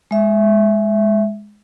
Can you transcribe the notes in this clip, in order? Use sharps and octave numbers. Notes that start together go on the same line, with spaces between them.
G#3 E5